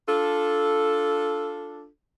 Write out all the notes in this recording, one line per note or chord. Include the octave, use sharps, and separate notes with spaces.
D4 F4 A4